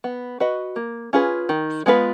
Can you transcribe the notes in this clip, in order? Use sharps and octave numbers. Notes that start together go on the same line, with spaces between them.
B3
F#4 B4 D#5
A#3
C#4 F4 G#4 B4
D#3
G#3 B3 F4 B4